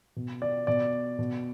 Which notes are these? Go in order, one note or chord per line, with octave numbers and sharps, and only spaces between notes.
B2
D5
B2 D5
B2